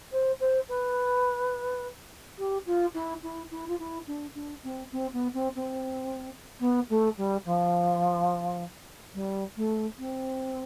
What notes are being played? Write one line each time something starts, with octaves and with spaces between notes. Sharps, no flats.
C5
C5
B4
G4
F4
E4
E4
E4
F4
E4
D4
D4
C4
C4
B3
C4
C4
B3
A3
G3
F3
G3
A3
C4